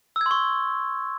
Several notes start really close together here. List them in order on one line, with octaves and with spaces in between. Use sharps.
E6 G#6 C6 C#6